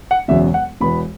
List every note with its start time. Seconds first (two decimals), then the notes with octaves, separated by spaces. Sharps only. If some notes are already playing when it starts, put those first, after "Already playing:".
0.11 F#5
0.28 E1 E2 C#3 F#3 E5
0.54 F#5
0.81 E1 E2 E3 B3 B5